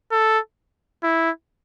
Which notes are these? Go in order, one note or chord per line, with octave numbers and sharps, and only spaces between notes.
A4
E4